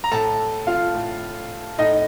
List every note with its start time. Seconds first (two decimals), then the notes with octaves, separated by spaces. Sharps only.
0.04 A#5
0.11 A2 A4 A5
0.67 F4 F5
0.95 A2
1.78 A2 D#4 D#5